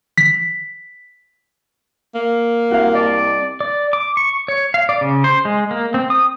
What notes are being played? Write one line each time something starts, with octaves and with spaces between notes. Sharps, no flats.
B6
A#3
C2 F#4 F5
D5 D#5 A5
D5
D6
C#6
C#5
F5
D5
C#3
C5
G#3
A#3
C4
D#6